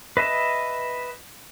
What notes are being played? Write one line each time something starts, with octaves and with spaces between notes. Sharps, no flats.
B4 D#5 E5 A5